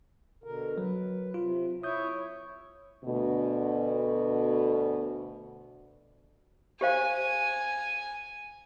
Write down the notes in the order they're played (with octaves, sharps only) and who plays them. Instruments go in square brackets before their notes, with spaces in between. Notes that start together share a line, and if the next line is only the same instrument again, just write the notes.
[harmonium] B2 D3 A#4
[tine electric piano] F#3 [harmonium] B4
[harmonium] C3 [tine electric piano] F4
[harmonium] E4 C#5 E5 [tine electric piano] D#6 G6
[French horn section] D2 B2
[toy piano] G4 C5 F5 [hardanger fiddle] G#5